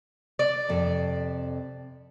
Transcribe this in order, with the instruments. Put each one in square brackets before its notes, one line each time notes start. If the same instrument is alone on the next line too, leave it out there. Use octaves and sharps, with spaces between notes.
[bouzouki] D5
[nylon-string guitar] F2 C3 A4